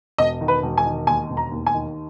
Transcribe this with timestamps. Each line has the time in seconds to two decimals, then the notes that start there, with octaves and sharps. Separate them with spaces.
0.18 E1 D#5
0.41 D#3
0.48 B4
0.62 E1
0.78 G#5
0.86 D#3
1.07 D#2 G#5
1.29 E1
1.37 A#5
1.52 D#2
1.66 G#5
1.74 D#3